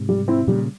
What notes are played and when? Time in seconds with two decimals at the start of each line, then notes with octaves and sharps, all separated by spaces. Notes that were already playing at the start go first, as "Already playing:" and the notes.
Already playing: G#2 C3
0.09 G3
0.28 C4 E4
0.47 A#2 C#3 G3